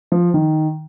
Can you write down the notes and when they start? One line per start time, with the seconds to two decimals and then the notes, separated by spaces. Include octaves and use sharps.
0.12 F3
0.34 D#3